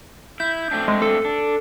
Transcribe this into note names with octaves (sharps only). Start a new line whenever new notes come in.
E4 G6
A3 C4 D4
G#3
A4
D4